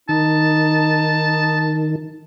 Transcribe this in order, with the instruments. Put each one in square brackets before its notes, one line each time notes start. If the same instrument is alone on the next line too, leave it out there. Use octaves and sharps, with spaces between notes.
[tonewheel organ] D#3 [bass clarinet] D#4 [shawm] A5